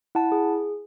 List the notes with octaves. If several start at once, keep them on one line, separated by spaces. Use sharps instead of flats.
E4 F#5 A5
G#4